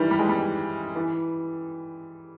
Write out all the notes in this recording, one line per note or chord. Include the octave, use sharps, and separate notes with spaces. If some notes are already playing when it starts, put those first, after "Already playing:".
Already playing: D#3 E3 G3
G3
G#3
G3
E3